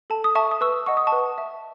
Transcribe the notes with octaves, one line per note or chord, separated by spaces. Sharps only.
A4 A5
D#6
E5 A5 C#6
D#6
B4 C#6 E6
D#5 F#5 C#6
D#6
A5 C#6
B4
E5